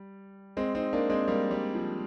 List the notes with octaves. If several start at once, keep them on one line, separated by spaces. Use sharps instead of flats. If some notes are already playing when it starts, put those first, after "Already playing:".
Already playing: G3
G#3 C4
C4 D#4
A#3 D4
G#3 C4
G3 A#3
G3
F3